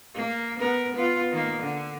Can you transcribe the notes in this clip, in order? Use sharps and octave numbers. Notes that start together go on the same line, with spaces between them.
A#3
B3 A#4
B3 F4
D#3 A#3
D3